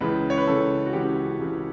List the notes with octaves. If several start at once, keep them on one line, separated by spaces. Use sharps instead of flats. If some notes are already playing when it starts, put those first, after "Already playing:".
C#2 C#3 E3 B4
C#5
B4
C#2 C#3 E3 A4
F#4
C#2 C#3 E3 G4
C#2 C#3 E3